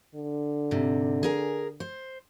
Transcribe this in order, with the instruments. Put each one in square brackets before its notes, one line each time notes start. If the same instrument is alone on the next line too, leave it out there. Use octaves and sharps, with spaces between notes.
[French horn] D3
[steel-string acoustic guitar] G#2 C3
G#4 A#4 G#5
C5